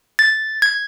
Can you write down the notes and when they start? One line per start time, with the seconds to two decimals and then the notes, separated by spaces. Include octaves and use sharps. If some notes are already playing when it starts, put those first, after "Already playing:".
0.19 A6
0.62 G#6